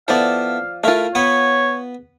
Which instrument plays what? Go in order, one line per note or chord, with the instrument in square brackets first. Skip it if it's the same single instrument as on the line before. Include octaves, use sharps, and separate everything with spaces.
[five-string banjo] F3 D5 [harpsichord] B3 E4 A4 [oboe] F5
[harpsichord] A3 E4 A#4 [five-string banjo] F4 F5
[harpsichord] B3 B4 F#5 [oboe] C#5